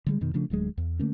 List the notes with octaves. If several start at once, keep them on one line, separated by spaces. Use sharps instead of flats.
D3 G3 G#3
F2 B2 D#3
C#3 F3 A3 D4
D1 D2 F#3 G#3
E2
D3 A3 A#3 C#4